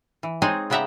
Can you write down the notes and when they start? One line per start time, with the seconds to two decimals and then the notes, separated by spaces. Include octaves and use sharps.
0.23 E3
0.42 G#3 C4 D#4 G#4 C#5 D#5
0.70 C#3 B3 G4 E5 F#5 A#5